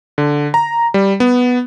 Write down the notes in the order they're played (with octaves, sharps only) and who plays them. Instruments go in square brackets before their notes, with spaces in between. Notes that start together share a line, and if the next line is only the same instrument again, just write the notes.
[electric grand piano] D3
A#5
G3
B3